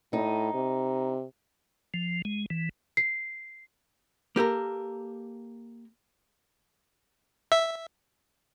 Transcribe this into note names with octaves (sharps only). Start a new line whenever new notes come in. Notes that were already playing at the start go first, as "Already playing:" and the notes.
A2 D#4
C3
F3
G#3
E3
C7
A#3 G4 A4 A#4
E5